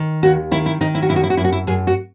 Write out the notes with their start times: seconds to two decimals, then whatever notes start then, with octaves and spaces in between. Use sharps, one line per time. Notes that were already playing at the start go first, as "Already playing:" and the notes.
Already playing: D#3
0.23 D#2 F#4
0.51 D#3 E4
0.66 E4
0.81 D#3 D#4
0.95 E4
1.03 F#4
1.09 F#2 E4
1.16 F#4
1.23 E4
1.30 F#4
1.37 F#2 E4
1.45 F#4
1.52 E4
1.67 F#2 G#4
1.87 F#4